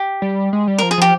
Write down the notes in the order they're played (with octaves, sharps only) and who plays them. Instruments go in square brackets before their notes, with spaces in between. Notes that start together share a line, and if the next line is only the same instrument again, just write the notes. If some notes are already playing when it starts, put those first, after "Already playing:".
Already playing: [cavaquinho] G4
[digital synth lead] G3
G#3
G3
[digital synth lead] F3 [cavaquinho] A#4
[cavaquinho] G#4
[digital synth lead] F3 [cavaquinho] G4